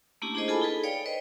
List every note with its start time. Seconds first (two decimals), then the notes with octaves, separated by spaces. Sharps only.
0.22 A3 A#3 C#4 D4 E4 G4
0.35 D4 E4 G#4 C5 D#5
0.48 F4 G#4 A4 G#5 A5 B5
0.61 D#4 G#4 A4 B4
0.84 C#5 D5 F5 G5
1.06 B4 C5 D#5